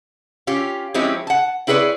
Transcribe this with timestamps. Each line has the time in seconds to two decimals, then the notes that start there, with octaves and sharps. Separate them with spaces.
0.47 C#4 F4 G4
0.94 F3 G#3 C4 C#4 E4 G4
1.27 F#5 A5
1.67 C4 E4 G#4 B4 C#5 D5